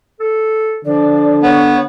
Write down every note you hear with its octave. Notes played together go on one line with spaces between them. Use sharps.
A4
D3 F3 D5
B3 C#5